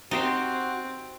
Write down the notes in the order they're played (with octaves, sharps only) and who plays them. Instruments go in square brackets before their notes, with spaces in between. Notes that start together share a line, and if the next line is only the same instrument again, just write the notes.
[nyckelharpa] C4 [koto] D#4 G4 C5 [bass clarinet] F#4